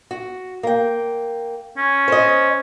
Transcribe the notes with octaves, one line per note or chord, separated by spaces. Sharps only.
F#4
A#3 G5
C#4
C5 D#5